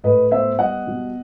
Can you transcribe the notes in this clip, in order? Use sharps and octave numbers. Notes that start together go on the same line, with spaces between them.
A2 B4 D#5
B3 C5 E5
G3 D#5 F#5
B2